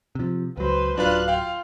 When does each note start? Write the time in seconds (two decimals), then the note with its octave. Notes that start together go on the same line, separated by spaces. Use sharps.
0.15 C3 F3
0.57 C#2 F#3 B4 C5
0.98 D1 F#3 D4 F4 B4 F5 F#6
1.28 F4 F5 G5